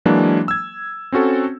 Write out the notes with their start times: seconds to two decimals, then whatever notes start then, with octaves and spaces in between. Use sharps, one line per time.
0.05 E3 F#3 G#3 A#3 D4
0.48 E6 G#6
1.12 C4 C#4 F#4 A4